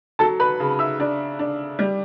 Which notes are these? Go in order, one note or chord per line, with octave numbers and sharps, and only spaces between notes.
F#3 A4 A5
B4 B5
C#3
E5 E6
D4
D4
G3